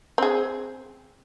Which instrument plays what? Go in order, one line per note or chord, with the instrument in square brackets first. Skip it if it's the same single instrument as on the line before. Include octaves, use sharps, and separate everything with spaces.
[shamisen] C4 G#4